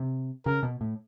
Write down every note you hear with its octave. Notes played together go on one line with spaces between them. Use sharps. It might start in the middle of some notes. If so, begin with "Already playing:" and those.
Already playing: C3
C#3 A#4
B2
A2